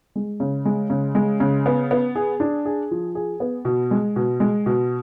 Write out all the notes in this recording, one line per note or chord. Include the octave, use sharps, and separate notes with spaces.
G#3
C#3
G#3
C#3
G#3
C#3
B3
B3
G#4
D4
G#4
F3
G#4
B3
B2
G#3
B2
G#3
B2